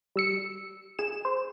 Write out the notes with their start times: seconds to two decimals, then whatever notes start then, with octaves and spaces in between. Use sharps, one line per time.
0.16 G3 E6 C#7
0.99 G#4 E7
1.25 C5